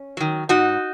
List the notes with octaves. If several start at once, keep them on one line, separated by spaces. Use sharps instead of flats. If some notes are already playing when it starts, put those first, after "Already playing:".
Already playing: C#4
D#3 F#3
G#2 D#4 F#4